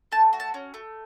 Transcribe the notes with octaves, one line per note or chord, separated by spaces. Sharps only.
A3 A5
F#4
A5
C#4
A3